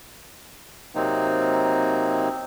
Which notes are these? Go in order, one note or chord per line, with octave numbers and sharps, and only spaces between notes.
C3 F#3 A#3 C4 D#4